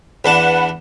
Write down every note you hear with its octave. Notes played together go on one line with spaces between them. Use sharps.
E2 D4 B4 F#5 A5